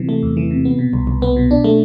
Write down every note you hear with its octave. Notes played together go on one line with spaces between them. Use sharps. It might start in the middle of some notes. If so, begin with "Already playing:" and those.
Already playing: C3 E3
A3
E2
E3
C3
B3
B2
C2
C2
B3
B2
D4
A3